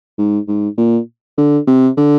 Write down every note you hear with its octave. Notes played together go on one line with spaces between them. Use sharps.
G#2
G#2
A#2
D3
C3
D3